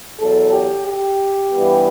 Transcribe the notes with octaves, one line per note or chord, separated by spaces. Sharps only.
E2 B2 F#3 A4
G4
G4
G2 E3 G3 B3